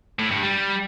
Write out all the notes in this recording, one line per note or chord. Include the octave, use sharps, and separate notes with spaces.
A2
G2
G3